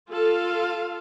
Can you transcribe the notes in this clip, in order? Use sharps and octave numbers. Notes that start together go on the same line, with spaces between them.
F4 A4 F5